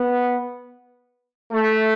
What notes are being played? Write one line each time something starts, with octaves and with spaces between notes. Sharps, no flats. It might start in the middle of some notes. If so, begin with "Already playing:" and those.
Already playing: B3
A3